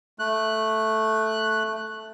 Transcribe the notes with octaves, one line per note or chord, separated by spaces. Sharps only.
A3 F#6